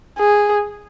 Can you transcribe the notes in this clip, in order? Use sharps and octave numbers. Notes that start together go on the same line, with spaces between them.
G#4